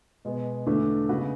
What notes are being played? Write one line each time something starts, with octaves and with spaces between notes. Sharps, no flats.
B2 G#3 B3
E2 D3 A3 D4 A4
C#3 G#3 B3 F#4 B4